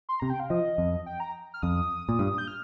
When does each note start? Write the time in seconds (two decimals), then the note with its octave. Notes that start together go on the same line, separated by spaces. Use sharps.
0.09 C6
0.20 C3 A#5
0.30 G5
0.40 F5
0.50 F3 D#5
0.78 F2
1.06 G5
1.20 A#5
1.54 F6
1.62 F2 D#6
2.09 A#2
2.19 G2
2.38 G6
2.48 F6